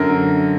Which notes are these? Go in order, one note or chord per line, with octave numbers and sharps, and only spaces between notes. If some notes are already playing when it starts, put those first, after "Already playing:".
Already playing: F#2 D3 A#4